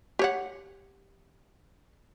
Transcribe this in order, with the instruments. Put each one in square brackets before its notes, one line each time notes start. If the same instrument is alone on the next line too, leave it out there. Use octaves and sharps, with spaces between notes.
[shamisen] G4 C#5 F#5